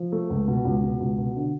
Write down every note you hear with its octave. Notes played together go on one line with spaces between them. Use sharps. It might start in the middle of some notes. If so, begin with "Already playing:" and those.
Already playing: F3
A3
C#2
B2
C#2
B2
C#2
B2
D3